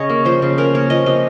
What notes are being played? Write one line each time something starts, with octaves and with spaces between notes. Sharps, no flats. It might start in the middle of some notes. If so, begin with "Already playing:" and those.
Already playing: C#3 C#5 D#5
A#3
F3 C5
C#3
C#4 A#4
A#3 C#5
F3 D#5
C3 D#5